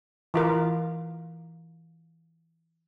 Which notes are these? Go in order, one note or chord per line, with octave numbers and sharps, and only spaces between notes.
E3 F4 A#4